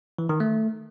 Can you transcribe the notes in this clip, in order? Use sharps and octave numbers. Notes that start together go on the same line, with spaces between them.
E3
D#3
A3